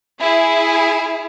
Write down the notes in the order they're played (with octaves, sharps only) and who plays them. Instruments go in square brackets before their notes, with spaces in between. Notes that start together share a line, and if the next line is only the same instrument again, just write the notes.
[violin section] E4 G#4